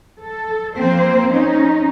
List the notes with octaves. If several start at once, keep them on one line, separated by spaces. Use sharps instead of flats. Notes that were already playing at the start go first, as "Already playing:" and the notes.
A4
F3 A#3 C4 C5
C#4 D#4